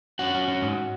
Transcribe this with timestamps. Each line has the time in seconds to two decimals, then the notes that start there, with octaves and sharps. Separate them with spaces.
0.19 C#4 F#4 F#5
0.34 C#4
0.48 C#4
0.62 G#2